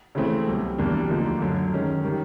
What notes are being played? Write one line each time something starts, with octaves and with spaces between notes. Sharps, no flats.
C#3 E3 A3 C4
C2 B2 F#3
E2 B2 G3 A#3 D4
D2 D3 F3 A#3 D#4
F#2 D3 F#3
D#3 G#3 C#4
D#3 G3